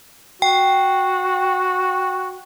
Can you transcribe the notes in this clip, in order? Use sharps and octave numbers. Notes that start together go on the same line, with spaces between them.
F#4 G5